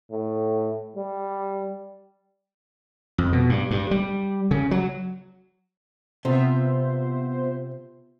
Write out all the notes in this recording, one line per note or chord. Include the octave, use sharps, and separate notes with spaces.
A2
G3
F2
B2
G2
G2
G3
C#3
F#3
C3 B3 F4 C5 E5